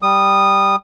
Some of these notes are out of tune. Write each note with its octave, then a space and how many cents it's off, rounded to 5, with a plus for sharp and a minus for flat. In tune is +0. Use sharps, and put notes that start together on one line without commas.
G3 +0 D#6 -15